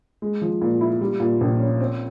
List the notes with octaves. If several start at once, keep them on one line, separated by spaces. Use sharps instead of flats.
G#3
F3
A#2
E4
G3
A#2
A#1
C#4
C4